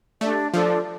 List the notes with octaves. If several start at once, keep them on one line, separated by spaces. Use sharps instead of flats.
A3 D4 G4 D5
F3 D4 F4 A4 D5